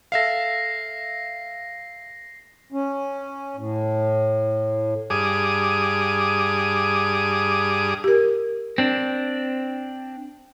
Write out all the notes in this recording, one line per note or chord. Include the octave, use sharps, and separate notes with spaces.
A4 E5 F5 A#6 C7
C#4
A2
G2 G#4 D6 D#6
G4 A#4
C4 D4